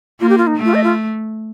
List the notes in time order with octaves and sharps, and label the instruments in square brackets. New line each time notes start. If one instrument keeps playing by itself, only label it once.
[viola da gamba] A#3 [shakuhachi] F4
[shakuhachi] G4
F4
D#4
[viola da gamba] A3
[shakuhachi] F4
D#5
F4